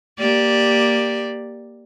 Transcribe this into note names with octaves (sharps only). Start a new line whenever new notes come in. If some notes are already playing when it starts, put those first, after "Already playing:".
A#3 G4 D5